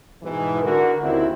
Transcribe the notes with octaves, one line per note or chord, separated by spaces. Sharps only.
G#2 B2 E3
D3 F#4 A#4
D#2 C#3 C4 E4